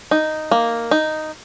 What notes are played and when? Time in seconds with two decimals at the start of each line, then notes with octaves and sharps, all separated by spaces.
0.11 D#4
0.51 A#3
0.91 D#4